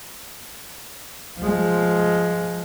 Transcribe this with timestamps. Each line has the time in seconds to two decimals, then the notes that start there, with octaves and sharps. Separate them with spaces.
1.40 F3 G#3